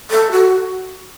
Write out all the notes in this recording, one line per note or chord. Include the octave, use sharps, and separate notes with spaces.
A4
F#4